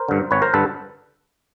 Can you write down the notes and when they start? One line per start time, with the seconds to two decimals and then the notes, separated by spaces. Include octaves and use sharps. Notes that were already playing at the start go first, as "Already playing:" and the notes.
Already playing: A#4 C5
0.08 G2 D3
0.31 G#1 B4 C#5
0.42 A#4 C5
0.53 G2 D3 A4 B4